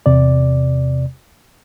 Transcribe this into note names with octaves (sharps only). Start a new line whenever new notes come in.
E2 C3 D5